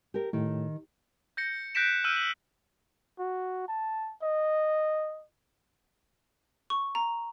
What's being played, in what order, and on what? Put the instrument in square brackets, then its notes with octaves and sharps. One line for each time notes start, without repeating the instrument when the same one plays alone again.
[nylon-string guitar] G4 A#4
[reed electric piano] A2 [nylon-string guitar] D#3
[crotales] G6 A#6 C#7
F#6 G6 A#6 B6 D7 E7
E6 F6 G6 D7 D#7
F#7
[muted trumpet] F#4
A5
D#5
[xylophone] C#6
A#5